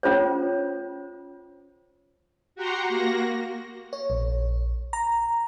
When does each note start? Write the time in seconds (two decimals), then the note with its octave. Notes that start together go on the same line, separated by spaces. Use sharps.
0.03 C#4 F4 C5 C#5
2.55 F#4 G4 F#5 A#5 C6
2.88 A#3 F#4 A#6
3.93 C#5
4.10 A#1
4.93 A#5